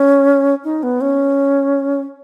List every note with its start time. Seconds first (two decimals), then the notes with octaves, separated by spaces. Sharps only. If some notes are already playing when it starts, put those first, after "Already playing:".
Already playing: C#4
0.64 D#4
0.83 B3
1.01 C#4